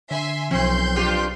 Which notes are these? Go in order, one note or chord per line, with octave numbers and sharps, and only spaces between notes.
D3 E5 G#5 C6
B1 F3 C4 C6 C#6 G6
G2 F4 G4